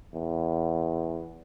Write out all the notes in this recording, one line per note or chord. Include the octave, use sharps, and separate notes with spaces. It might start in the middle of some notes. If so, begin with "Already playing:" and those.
E2